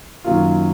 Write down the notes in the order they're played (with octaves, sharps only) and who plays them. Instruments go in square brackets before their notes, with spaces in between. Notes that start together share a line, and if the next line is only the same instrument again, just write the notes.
[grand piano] F#2 D#3 F#3 A#3 F4